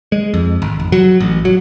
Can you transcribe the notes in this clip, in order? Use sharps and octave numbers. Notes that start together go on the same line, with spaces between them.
G#3
F2
G#1
F1
F#3
A1
F#3